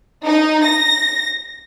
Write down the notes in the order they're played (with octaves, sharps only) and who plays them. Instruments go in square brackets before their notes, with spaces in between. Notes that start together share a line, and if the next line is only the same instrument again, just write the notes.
[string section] D#4
A#6